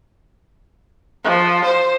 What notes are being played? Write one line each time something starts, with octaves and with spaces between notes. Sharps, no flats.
F3
C5